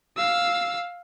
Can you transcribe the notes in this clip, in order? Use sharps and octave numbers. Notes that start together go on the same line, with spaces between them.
F5 E6